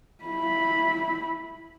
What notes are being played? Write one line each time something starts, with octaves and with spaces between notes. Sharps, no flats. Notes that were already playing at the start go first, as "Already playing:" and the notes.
E4 B5